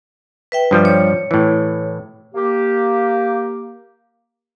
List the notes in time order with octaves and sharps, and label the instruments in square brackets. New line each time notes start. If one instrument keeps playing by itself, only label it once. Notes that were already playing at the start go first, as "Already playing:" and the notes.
[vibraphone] B4 E5 G5
[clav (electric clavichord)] G2 F3 G3
[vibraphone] C#5
[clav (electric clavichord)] A2 E3
[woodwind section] A#3 G4